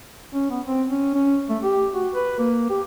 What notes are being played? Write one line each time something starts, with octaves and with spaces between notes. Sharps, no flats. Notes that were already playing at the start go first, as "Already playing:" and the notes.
C#4
B3
C4
C#4
C#4
A3
G4
F#4
B4
A#3
G4